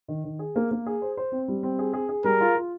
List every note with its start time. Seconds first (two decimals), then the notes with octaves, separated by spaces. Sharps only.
0.08 D#3
0.24 D#3
0.39 G#4
0.56 A#3
0.71 A#3
0.86 G#4
1.02 C5
1.17 C5
1.32 C4
1.48 G3
1.63 C4
1.79 G#4
1.93 G#4
2.09 G#4
2.24 G3 A#4
2.41 F4
2.55 F4